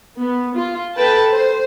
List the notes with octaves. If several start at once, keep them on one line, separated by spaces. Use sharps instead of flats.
B3
F4
A4 B4 G5 A5
C5